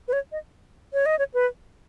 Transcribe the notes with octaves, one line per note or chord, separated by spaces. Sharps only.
B4
C#5
D#5
C#5
D#5
C#5
B4